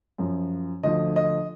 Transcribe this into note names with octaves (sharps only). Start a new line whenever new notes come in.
F#2 F3
D2 D3 F3 D#5
D#5